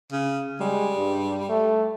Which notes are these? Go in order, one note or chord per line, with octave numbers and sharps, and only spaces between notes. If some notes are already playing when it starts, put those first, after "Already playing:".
C#3
G3 G#3
G2
A3